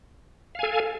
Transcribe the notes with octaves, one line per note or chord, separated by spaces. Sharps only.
A4 F5 G#5